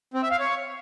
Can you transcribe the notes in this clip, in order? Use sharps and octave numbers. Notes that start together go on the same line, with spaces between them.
C4
E5
F5
C#5